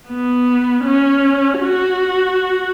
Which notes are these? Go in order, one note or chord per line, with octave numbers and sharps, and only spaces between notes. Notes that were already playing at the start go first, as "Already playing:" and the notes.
B3
C#4
F#4